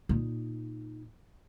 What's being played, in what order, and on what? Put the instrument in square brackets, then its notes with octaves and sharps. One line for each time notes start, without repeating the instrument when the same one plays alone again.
[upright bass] A#2 D#4